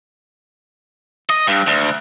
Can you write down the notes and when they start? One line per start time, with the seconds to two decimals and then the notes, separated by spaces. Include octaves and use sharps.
1.30 D#5
1.47 G2
1.67 D2